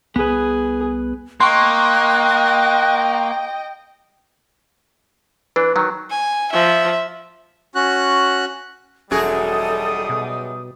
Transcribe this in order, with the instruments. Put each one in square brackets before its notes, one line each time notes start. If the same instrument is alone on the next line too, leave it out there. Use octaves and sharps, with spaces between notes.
[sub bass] C2 [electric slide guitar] B3 B4 [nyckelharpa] G#4
[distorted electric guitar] A#3 [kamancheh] D#5 G5 [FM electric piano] C6 C#6 [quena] F#6
[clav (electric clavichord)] E3 D4 [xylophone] B4
[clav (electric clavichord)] D#3 F#3
[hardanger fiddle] G#5
[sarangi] F3 [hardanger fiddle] E5
[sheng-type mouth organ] C#4 F#4 F#6
[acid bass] E1 [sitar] F#2 F#4 G#4 [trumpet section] G3 D#4 D#6 [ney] A4
[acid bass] B2